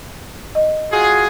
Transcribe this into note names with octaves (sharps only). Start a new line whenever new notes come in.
D#5
F4 F#4 G#4